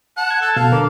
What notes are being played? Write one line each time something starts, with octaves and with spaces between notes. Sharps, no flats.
F#5 A5
G#6
A4
B2 A4 F5
D3 A#4 D6